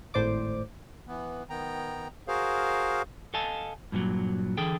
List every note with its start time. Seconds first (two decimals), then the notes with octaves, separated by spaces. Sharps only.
0.14 G#1 A2 C5 D5 D6
1.08 E3 B3
1.50 D#3 B3 G5 A#5
2.28 F#4 G#4 A#4 C5 F5
3.34 A4 D#5 F5 G#5 A5
3.92 G2 A#2 D#3 F#3
4.57 D3 E3 G#4 A4 G5